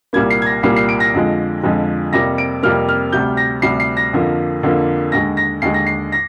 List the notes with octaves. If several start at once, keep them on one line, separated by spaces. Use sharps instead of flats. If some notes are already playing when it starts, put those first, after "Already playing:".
C2 A#2 G3 A#3 G#6
C7
G#6
A#6
C2 A#2 G3 A#3 C7
C7
D7
A#6
F2 D3 F3 G#3
F2 D3 F3 G#3
F2 C3 G3 A#3 A#6
D7
F2 C3 G3 A#3 F6
F6
D2 C3 G3 G6
A#6
D2 C3 G3 C7
C7
A#6
F2 D3 F3 A#3
F2 D3 F3 A#3
D#2 D3 G#3 A#6
A#6
D#2 D3 G#3 C7
A#6
C7
A#6